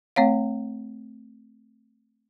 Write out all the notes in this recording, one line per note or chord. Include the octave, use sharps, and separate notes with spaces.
A3 C4 C#5 F5